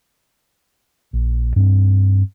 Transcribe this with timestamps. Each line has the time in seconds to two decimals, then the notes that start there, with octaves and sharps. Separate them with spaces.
1.13 A#1
1.56 G2 C4